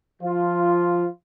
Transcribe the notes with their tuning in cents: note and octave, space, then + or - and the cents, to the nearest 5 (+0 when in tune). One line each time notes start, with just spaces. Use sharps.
F3 +0 F4 +0